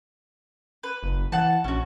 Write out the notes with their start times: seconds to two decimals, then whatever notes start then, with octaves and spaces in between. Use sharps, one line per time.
0.83 B4
1.03 F#1
1.32 E3 F#5 A5
1.64 A#1 C#4 F#4